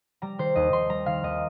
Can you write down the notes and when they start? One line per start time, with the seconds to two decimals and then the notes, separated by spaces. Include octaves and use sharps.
0.22 G3 A#5
0.38 D#3 C5
0.56 D#2 D#5
0.72 D#2 C6
0.90 G3 A#5
1.06 D#3 F5
1.23 D#2 D#5